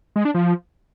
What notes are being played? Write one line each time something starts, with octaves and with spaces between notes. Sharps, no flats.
G#3
D4
F3